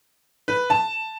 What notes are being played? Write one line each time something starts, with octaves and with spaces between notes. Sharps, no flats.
B4
A5